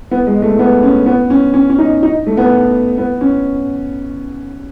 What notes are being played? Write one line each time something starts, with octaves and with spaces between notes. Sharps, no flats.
B3
G#3
A3
B3
C#4
B3
C#4
C#4
C#4
D#4
D#4
A3
B3
B3
C#4